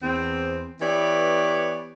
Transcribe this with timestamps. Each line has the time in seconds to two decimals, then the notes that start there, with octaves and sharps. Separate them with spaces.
0.02 E2 C4
0.81 E3 B3 G4 C#5 D5